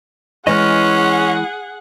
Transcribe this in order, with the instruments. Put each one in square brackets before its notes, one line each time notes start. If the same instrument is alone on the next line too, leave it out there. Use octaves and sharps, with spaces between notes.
[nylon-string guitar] E3 G#3 [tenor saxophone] C#4 [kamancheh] G#4 F#5 [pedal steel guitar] D#5 F6